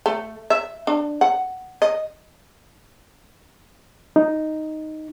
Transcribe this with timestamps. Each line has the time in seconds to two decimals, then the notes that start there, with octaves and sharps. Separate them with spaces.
0.06 A3
0.50 E5
0.87 D4
1.21 F#5
1.82 D#5
4.16 D#4